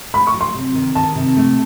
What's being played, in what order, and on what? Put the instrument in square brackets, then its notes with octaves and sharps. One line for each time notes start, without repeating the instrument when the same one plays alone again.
[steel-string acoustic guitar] A3 [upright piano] B5
[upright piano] C#6
[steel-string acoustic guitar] F#3
[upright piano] C6
[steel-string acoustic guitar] C3
D#3
[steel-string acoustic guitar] D#3 [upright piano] A5
[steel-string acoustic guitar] C3
A3